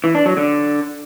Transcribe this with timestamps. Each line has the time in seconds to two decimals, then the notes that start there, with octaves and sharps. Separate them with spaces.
0.04 E3
0.15 D4
0.26 F#3
0.37 D3